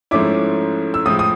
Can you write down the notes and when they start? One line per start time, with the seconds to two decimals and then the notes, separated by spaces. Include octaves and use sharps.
0.11 G#2 F3 A3 C#4 E4 D6
0.94 E6
1.06 A2 F3 G#3 D#6
1.19 D#6